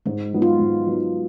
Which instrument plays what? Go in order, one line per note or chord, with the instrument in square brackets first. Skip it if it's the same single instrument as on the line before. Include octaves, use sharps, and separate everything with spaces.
[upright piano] G#2 [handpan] G#3
[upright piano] F#3 B3 D#4
[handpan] F4
[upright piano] G#2
F#3 B3 D#4